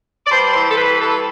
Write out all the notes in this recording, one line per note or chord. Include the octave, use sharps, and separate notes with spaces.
D5
G2 C5
E3 C5
A4
G2 B4
G2 A4